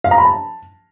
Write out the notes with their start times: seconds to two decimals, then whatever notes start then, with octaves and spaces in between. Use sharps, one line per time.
0.04 F5
0.11 A#5
0.18 B5
0.25 A5